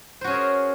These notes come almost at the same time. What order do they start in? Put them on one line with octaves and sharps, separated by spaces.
C5 F#4 C#4 G#4 A#4